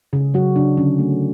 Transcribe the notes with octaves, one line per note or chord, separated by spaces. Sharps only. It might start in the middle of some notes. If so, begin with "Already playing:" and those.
C#3 G#4
F#3 F#4
C#3 D4
D3 C#4
A3